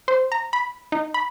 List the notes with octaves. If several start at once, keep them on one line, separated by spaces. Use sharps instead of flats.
C5
A#5
B5
D#4
B5